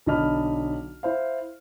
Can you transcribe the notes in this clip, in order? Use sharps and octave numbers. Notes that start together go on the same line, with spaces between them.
B1 D3 D4 D#5 B5 F6
E4 C5 F5